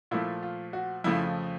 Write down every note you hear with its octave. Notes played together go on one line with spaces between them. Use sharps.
A#2 F3 A3 E4
F4
F#4
F2 C#3 F3 A3 E4